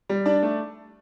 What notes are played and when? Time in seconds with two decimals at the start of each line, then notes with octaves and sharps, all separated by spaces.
0.09 G3
0.26 D4 D5
0.43 A3